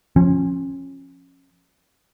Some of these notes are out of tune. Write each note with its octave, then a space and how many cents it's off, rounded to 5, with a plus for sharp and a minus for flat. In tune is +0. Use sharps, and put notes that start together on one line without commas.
F3 +0 C#4 -25